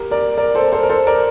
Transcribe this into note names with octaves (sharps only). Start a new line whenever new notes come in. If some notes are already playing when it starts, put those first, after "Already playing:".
Already playing: G4 A#4
A#4 D5
A#4 D5
A4 C5
A4 C5
A#4
A4 C5
A#4 D5